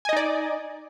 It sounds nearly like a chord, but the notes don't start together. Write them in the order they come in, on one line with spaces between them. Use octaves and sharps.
G#5 D#5 D#4 D5